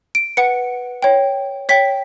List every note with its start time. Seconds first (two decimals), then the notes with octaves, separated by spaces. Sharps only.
0.15 D7
0.37 B4 F#5 C#7
1.02 C#5 G5
1.69 C#5 G5 B6